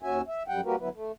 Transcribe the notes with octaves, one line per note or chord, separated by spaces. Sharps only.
D#2 C#4 F#4 E5 G#5
E5
F#2 G3 F#5 G5
G3 A#3 F#4 G4 A#4 B4
D2 F#3 B3 E4 B4
A3